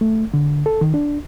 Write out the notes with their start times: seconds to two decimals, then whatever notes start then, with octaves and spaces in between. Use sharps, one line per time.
0.01 A3
0.34 D3
0.66 A4
0.81 D#3
0.94 D4